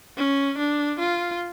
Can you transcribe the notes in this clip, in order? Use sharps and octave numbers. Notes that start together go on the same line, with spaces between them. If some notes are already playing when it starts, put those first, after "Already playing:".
C#4
D4
F4